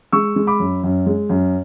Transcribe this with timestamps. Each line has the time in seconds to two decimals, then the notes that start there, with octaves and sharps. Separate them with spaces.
0.12 G#3 C#6 E6
0.36 G#3
0.47 B5 D6
0.59 F#2
0.83 F#2
1.06 G#3
1.29 F#2